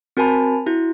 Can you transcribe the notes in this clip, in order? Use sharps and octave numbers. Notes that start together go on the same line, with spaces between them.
C4 F#4 A#4 G#5 A5 B5
E4 F#4